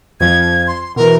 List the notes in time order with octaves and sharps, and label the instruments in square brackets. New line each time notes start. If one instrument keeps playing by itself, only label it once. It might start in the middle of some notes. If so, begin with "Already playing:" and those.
[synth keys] F2 F3 [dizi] G#6
[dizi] C6
[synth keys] B2 E3 [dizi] A#4